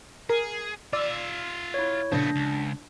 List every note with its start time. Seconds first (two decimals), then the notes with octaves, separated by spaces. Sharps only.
0.30 G#4 A#4
0.93 F4 D5 E5 E6
1.74 E4 C#5
2.12 A#2 C#3 F3 A3 B3 D4 A#6
2.36 C#2